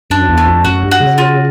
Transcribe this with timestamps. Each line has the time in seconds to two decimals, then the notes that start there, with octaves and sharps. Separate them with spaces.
0.10 F#2 D4
0.29 E2
0.38 A3
0.47 F2
0.64 F#2 F#4
0.83 G2
0.91 F#4
1.00 C#3
1.18 F4